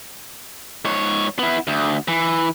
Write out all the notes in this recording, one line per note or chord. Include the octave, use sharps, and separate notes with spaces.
G#2 C#5
B3 E4
D2
E3